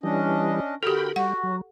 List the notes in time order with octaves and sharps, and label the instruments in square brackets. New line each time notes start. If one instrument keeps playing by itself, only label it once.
[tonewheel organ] E3 G3 [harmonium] C#4 D4 D#5
[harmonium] D3 A#4 [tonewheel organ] F#4 G5 B5 [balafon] G4 A4
[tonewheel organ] G3 [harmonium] F#4 [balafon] F#5
[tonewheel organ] F#3